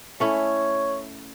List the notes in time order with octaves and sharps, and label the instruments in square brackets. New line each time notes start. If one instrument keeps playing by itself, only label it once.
[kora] A3 C#4 E4 [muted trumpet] C#5